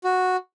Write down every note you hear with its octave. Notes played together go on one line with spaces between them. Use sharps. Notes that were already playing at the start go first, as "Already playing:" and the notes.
F#4